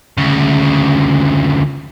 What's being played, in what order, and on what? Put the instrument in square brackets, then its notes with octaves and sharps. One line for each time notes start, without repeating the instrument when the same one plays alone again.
[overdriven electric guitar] D2 C#3